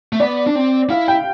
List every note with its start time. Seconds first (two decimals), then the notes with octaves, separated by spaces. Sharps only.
0.13 A3
0.20 B3 D5
0.47 D4
0.55 C4
0.90 E4 F5
1.08 G5